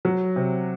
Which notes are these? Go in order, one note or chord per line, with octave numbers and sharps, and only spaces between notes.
F#3
C3